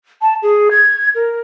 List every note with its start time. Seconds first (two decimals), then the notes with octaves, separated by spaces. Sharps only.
0.21 A5
0.42 G#4
0.71 G#6
1.14 A#4